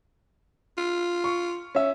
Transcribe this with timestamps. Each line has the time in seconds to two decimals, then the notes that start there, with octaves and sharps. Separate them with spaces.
0.77 F4
1.24 C#6
1.75 C#4 E5